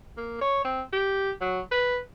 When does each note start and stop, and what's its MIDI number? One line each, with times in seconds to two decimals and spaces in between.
0.17 0.40 58
0.41 0.63 73
0.65 0.82 60
0.93 1.31 67
1.41 1.60 54
1.72 1.98 71